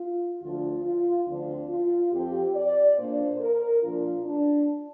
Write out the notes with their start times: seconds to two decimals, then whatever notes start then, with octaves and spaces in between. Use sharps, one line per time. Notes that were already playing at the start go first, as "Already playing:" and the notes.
Already playing: F4
0.41 D2 D3 F3 D4 F4
0.84 F4
1.27 D2 D3 F3 C4 D4
1.69 F4
2.12 F2 F3 C4 G4
2.54 D5
2.97 A#2 A#3 D4 C5
3.40 A#4
3.82 A#2 F3 D4 F4
4.24 D4